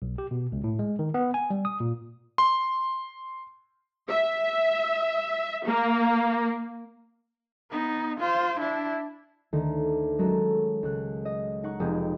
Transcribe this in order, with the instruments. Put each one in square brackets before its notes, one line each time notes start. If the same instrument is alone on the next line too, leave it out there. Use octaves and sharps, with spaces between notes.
[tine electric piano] B1
G4
B2
C#2
A2
G#3
D#3
B3
G#5
G3
D#6
A#2
[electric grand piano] C6
[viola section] E5
A#3
[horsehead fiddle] B3 D#4
F4 C5
D4 E4
[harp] D2 D#3
F#3 G#3 C#4 F#4 A4 A#4
C#2 F#6
D#5
D#4 F#5 C#6
F1 C4 G4 G#4 D#6 F6